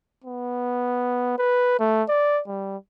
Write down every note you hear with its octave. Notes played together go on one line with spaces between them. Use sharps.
B3
B4
A3
D5
G3